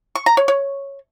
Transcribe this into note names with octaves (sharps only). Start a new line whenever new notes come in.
C#6
A#5
C#5
C#5